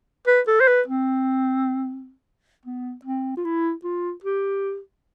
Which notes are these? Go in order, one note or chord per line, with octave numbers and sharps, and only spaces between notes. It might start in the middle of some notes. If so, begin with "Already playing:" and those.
B4
A4
C5
B4
C4
B3
C4
F4
E4
F4
G4